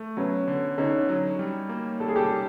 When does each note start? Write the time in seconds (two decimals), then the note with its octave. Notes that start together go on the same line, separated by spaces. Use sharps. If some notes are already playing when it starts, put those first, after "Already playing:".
Already playing: A3
0.17 F#3 B3 C#4
0.48 D3
0.78 D3 C#4 D#4
1.09 F#3
1.39 G3
1.69 A#3
2.00 G3 A4
2.08 G#4
2.16 G4 A4
2.31 G3